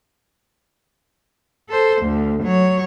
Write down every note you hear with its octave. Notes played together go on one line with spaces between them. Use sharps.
A4 C5
D2
F#3 C#5